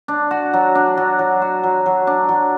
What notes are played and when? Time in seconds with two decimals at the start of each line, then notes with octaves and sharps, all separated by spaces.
0.08 D4
0.31 F#4
0.53 F#3
0.75 D4
0.97 F#3
1.19 F#3
1.42 F#4
1.63 F#3
1.86 F#3
2.07 D4
2.29 F#3